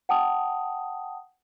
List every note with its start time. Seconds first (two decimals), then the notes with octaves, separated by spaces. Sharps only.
0.09 F#5 G5 A5 D#6